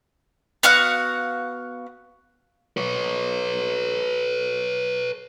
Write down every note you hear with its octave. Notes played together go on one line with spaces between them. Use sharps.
B3 F#4 F5 F#5
B4 C#5